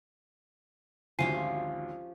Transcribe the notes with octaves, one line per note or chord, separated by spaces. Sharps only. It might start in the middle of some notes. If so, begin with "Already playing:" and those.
G#1 D2 F3 C#4 G4 G#5 C7 D#7